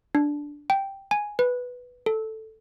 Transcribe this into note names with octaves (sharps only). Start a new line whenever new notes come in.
D4
G5
G#5
B4
A4